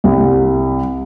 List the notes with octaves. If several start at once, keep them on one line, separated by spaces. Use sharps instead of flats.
C2